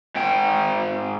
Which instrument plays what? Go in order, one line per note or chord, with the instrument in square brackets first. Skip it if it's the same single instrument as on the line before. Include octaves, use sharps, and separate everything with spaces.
[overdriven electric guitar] G#2 G5